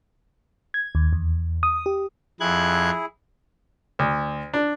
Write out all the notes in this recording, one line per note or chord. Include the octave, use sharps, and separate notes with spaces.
G#6
D#2
E2
D#6
G4
F2 E4 G#4 F#6 G#6
D2
D4